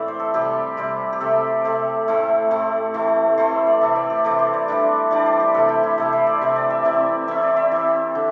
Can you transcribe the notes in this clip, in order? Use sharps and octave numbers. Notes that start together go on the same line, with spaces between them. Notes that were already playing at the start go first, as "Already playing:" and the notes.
Already playing: A2 E3 C4 D5 E5
C5
A4
C3 G3 C4 G4
C3 G3 C4
G4
C3 A3 C4 A4
C3 A3 C4
A2 A3 C4
A2 A3 C4
E3 A3 C4
E3 A3 C4 C5
E5
D5
C3 E3 A3 E5
D5
G4
C3 E3 A3 G4
C5
D5
E3 G3 D4
E3 G3 D4 D5
C5
G4
C3 A3 C4 A4
G4
E4
C3 A3 C4 G4
C5
D5
C3 E3 C4 E5
D5
E5
C3 E3 C4 D5
E3 C4 E5
D5
E5
E3 C4
D3